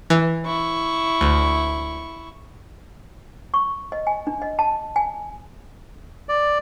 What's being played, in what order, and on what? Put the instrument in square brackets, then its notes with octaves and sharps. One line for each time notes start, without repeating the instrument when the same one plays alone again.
[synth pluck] E3
[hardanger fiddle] E4 C#6
[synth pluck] D2
[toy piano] C#6
D#5
G#5
D4
D#5
A5
G#5
[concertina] D5